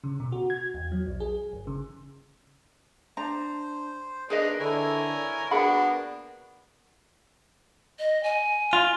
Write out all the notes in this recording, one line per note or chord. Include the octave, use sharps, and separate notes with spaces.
C#3
B2
F#4
G#6
E2
F#3
B1
G#4
G1
C#3
D4 C5 A#5
A#3 D4 D#4 G#4 B4 D#5
D3 E4 A#4 C#5 G#5
A#3 B3 D4 F#4 G#4 F#5 B5
D#5
G#5
F4